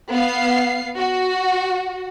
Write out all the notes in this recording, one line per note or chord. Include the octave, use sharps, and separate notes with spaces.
B3 F5 C7
F#4